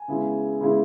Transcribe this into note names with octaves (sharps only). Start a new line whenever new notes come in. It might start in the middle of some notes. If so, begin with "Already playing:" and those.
Already playing: G#5
C#3 G#3 B3 E4
C#3 G#3 B3 E4